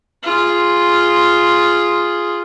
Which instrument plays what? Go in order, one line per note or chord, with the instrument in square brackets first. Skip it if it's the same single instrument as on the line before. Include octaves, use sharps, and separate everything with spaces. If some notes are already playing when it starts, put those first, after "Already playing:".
[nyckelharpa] F4 G#4